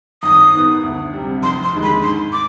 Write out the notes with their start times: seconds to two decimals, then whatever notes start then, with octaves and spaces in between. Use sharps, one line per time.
0.23 G#1 D#6
0.52 G#2 D#3 B3
0.83 D2
1.13 C3 G3
1.42 F1 C6
1.63 C6
1.73 D#2 D3 G#3
1.83 B5
2.02 G#2 C6
2.32 D6